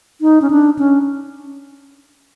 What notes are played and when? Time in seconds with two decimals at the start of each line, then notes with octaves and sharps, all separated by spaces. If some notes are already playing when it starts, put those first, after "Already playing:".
0.21 D#4
0.42 C#4
0.50 D4
0.79 C#4